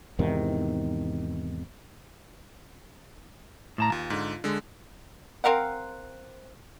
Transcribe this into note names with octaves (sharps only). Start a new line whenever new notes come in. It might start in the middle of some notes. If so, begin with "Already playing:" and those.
E2 G#2 C3 D#3
A2 A5 A#5
D#2 F4
G#2 D3
D3 G#3
C4 A#4 F5 F#5